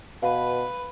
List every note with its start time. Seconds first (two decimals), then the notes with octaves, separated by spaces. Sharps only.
0.23 B2 B4 F5